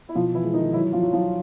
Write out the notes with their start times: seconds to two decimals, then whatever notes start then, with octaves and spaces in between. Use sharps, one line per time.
0.09 E4
0.15 B2 F3 F4
0.34 E3 E4
0.44 G#3
0.54 D#3 D#4
0.73 E3 F#3 E4
0.93 F3 F4
1.03 F#3
1.13 F3 F4